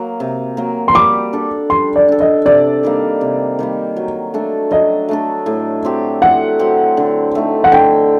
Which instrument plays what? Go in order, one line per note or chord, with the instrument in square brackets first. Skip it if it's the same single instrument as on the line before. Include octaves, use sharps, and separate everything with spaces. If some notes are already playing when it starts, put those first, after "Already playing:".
Already playing: [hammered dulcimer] F#3 A#3
C3
F#3 A#3
[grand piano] C6
[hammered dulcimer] G3 [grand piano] D6
[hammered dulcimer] D4 A4
[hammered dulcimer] G3 [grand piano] C6
[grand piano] D5
[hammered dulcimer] D4 A4
[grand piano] D#5
[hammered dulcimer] C3 [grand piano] D5
[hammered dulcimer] D#3 G3 A#3
C3
D#3 G3 A#3
F#3
A3 D4 A4
[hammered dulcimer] F#3 [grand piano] D#5
[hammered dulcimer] A3 D4 A4
A2
F#3 C4 G4
[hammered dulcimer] A2 [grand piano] F#5
[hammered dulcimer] F#3 C4 G4
D3
A3 D#4
[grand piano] F#5
[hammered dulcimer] D3 [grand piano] G5